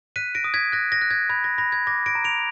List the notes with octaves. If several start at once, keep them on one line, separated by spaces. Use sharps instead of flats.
F#6 B6 D#7
A#6 D7
D#6
G#6 B6
F#6 A#6
A#6
F#6
G#6
B5 G#6
A#6
B5 A#6
G#6
D6 A#6
A#6 D7
A#5
D7 F7